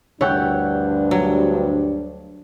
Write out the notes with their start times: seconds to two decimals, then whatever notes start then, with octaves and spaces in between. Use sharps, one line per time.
0.21 D2 G2 D4 E4 C#5 F#5 G5
1.11 F#3